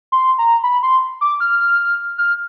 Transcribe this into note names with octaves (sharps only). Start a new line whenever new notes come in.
C6
A#5
B5
C6
D6
F6
F6